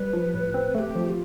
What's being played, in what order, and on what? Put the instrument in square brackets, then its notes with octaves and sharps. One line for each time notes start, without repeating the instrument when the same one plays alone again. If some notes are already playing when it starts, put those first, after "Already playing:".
Already playing: [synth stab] G3 [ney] B4
[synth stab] F3
A2
C4
[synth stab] A3 [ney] A4
[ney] G4
[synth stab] F3
[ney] G4
F4